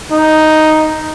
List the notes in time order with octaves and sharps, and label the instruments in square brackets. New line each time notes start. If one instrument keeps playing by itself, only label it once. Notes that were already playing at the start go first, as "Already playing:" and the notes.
[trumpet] D#4